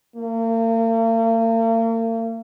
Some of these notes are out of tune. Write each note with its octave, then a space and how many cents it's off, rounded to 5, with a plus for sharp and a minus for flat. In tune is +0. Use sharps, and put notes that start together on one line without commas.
A#3 -45